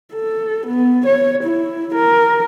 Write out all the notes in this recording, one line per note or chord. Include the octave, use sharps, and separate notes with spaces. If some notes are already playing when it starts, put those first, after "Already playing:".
A4
B3
C#5
E4
A#4